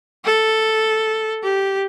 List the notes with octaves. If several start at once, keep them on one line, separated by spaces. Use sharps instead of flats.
A4
G4